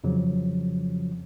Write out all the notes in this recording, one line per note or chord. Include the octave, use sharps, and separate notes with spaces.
F2 C#3 F3 F#3